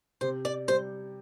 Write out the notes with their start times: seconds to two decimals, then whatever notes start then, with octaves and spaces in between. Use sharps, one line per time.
0.21 C3 C5
0.45 D5
0.68 G3 C5